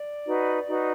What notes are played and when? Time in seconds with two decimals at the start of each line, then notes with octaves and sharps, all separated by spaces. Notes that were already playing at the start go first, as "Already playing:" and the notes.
Already playing: D5
0.26 D#4 F#4 B4
0.66 D#4 F#4 B4